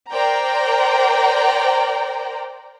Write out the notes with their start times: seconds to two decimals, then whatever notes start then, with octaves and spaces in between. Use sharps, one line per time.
0.11 A#4 C5 D5 G5 A#5